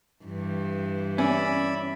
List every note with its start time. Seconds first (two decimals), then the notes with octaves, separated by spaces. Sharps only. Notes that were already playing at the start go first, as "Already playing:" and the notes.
0.24 G2 E3
1.18 C#4 D5 E5 B5